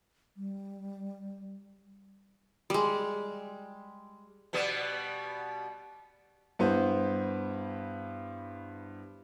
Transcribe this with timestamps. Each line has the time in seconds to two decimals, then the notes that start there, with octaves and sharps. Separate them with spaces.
0.37 G3
2.70 G3 G#3
4.53 B2 G3 B3
6.59 G2 B3 E4 C5